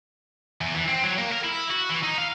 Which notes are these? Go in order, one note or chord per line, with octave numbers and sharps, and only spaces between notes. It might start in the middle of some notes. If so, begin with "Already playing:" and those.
E2
E3
C4
F#3
A#3
A#4
E4
F#4
E3
D#4
F5